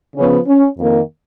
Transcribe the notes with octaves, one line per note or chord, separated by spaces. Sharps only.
C#3 F3 B3 C#4
C#4
F2 D#3 A#3